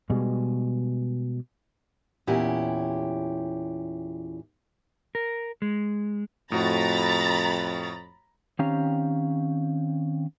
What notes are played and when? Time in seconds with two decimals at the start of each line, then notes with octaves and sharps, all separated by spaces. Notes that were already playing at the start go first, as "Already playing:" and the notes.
0.10 B2 G3 G#3
2.27 E2 A#2 C#4 E4 G4
5.15 A#4
5.62 G#3
6.52 F2 A2 F#4 A#5 B5 A6
8.59 D#3 C4 C#4 G4 F5 A#5